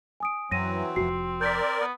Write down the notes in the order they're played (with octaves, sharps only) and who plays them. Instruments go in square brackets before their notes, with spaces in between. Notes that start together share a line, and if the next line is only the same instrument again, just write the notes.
[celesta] G#5 D#6 D7
[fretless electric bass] F#2 [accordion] E3 F#3 [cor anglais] C4 [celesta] A#6 D#7
[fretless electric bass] F1 F2 [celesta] F#4 C7
[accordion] A#4 D5 [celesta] G6 B6
[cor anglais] B3